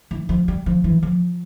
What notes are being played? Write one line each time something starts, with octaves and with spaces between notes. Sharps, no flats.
E3
F3
G3
F3
E3
F3